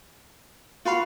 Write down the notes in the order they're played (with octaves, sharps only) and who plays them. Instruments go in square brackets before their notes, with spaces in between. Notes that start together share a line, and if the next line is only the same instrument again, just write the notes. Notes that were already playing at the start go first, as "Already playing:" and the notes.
[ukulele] F4 F#4 B5 [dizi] F5